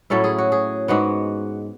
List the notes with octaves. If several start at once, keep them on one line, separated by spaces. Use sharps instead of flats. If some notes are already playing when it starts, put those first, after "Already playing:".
A2 F#3 C#4 E4 A4
G#4
F#4
G#4
G#2 G#3 B3 F#4